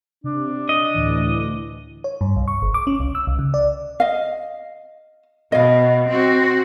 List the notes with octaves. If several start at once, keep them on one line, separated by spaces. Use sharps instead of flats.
C3 D4
D#5
D2 A2 E3
C#5
G2
C2
C#6
G1
D6
C#4
C2
E6
C2
C#3
D5
D#5 F5
B2 D#5 F5
C4 F#4